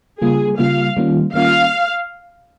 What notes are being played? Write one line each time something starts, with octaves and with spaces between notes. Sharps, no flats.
C#3 G3 A#3 F4 G#4
C#3 G3 A#3 F4 F5
D#3 G3 A#3 C#4 F4
D#3 G3 A#3 C#4 F4 F5